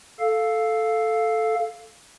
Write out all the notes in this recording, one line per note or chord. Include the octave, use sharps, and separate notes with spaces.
A4 F5